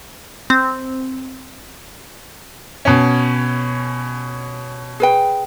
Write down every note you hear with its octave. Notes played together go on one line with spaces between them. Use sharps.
C4
B2 C#4
G#4 B4 G5